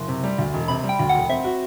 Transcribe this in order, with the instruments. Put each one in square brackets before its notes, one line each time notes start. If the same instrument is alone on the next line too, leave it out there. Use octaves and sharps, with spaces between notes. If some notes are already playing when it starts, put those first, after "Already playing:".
Already playing: [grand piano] F#1 [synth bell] C6
[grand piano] C3
G3
D2
E1
[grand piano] C3 [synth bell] B5
[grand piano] G3
[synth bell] G5
[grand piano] D2
[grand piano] E1 [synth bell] F#5
[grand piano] C4 [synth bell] E5
[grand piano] F#4